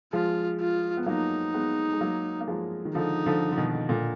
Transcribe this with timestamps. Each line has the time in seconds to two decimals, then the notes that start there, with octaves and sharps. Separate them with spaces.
0.13 F3 G#3 F4
0.60 F4
0.97 B3
1.06 F#3 A#3 D#4
1.54 G#3 B3
1.93 G#3
2.01 F#3 A#3
2.40 A#3
2.48 F3 G#3
2.85 D#3
2.95 D3 F3 D#4
3.26 D3 F3
3.52 D3
3.58 B2 D#3
3.89 A#2 D3